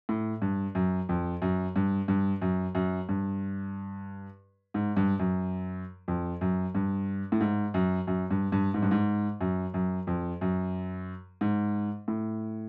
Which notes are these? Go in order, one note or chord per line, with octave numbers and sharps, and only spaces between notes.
A2
G2
F#2
F2
F#2
G2
G2
F#2
F#2
G2
G#2
G2
F#2
F2
F#2
G2
A2
G#2
F#2
F#2
G2
G2
G#2
G2
G#2
F#2
F#2
F2
F#2
G#2
A2